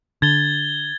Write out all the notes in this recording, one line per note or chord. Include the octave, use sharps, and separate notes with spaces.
D3 G#6 A6 G7